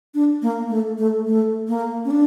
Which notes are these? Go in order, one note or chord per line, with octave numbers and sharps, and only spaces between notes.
D4
A#3
A3
A3
A3
A#3
C#4
D4